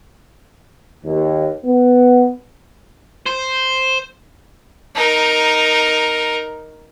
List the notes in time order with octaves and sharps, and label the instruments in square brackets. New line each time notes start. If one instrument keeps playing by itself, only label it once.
[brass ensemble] D#2
B3
[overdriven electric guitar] C5
[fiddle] D#4 A#4